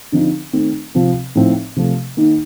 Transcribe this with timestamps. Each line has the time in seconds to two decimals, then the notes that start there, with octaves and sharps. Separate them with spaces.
0.12 D3 F3 C4 D#4
0.53 D#3 A3 C4 D#4
0.95 C3 F3 C4 F4
1.35 A2 F3 C4 D#4
1.76 C3 F3 A3
2.17 D#3 A#3 D#4